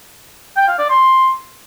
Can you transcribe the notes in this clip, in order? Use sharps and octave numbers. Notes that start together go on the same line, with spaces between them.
G5
F5
D5
C6